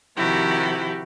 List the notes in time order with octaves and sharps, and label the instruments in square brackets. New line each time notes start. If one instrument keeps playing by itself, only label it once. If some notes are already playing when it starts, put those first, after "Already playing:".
[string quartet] C3 D#3 F3 E4 F#4 G4